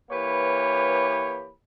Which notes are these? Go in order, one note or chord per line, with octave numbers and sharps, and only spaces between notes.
E3 A#3 G4 B4 C#5 B5